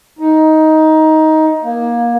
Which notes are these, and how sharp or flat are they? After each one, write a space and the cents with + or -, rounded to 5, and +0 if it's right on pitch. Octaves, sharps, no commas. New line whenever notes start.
D#4 +15
A#3 +20